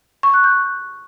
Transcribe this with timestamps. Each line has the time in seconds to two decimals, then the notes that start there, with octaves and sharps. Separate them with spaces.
0.23 C#6
0.34 F#6
0.44 G6